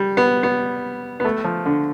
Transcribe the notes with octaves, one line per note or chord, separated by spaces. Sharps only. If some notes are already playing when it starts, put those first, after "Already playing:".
Already playing: G3
B3
B3
B3
A3
F3
D3